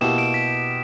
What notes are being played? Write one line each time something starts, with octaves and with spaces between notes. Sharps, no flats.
B2 A#3 E4 G4 E7
D7
B6